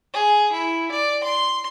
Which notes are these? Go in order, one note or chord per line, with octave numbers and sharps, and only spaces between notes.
G#4
E4
D5
C6